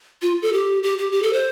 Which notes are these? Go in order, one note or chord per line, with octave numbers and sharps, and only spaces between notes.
F4
A4
G4
G4
G4
G4
A4
C5